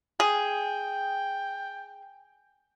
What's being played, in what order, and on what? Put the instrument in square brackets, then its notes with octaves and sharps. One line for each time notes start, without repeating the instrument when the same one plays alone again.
[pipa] G#4 [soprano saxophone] G5